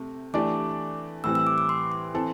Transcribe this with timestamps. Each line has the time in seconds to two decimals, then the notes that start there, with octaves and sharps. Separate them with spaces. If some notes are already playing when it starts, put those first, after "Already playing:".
Already playing: C3 A3
0.34 E3 A3 D4 G4 D5 D6
1.24 A2 E3 G3 C4 E6
1.35 E6
1.47 D6
1.58 D6
1.69 C6
1.92 C6
2.14 E3 C4 A4